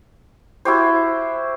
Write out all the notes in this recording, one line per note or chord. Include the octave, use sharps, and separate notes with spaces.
E4 F#4 G4 C5